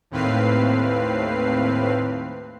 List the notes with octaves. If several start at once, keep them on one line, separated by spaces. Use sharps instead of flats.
D#2 A2 C4 B4 F5 C7